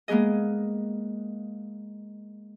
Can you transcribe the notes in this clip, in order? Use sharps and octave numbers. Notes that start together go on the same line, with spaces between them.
G#3 A#3 B3 G#4 D#5